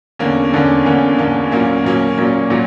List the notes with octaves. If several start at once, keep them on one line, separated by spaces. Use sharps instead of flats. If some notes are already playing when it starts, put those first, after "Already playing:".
E2 D3 A#3 C#4
E2 D3 A#3 C#4
E2 D3 A#3 C#4
E2 D3 A#3 C#4
A#2 F#3 A#3 C#4
A#2 F#3 A#3 C#4
A#2 F#3 A#3 C#4
A#2 F#3